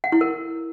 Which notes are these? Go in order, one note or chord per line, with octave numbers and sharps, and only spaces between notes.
F#5
E4
A#4